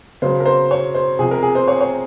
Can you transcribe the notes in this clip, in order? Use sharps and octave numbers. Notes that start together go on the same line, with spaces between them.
C#3 F#3 C5
A#4
C5
C#5
C5
C3 F3 G#4
A#4
G#4
C5
C#5
C#5